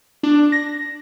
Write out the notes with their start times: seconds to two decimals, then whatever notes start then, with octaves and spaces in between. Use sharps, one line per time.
0.23 D4
0.52 A#6